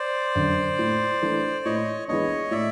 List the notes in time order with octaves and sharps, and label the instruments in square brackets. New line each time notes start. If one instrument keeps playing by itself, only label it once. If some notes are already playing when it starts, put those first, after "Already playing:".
Already playing: [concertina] C5 D5
[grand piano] F#2 D3
A2
E3 A3 D4
[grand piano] A2 [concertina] C#5 D#5
[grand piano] E3 G#3 B3 D4 [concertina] C#5 D#5
[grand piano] A2 [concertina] D5 E5